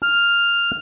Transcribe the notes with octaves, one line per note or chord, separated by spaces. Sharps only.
F6